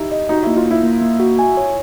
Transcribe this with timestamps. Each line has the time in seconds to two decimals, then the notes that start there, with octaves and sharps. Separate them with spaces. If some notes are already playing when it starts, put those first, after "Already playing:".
Already playing: D#4 E4 G4
0.12 D#5
0.29 D#4 F#4
0.43 A#3 E4
0.57 F4
0.65 A#3
0.71 E4
0.83 A#3
1.01 A#3
1.20 F#4
1.39 G#5
1.57 C#5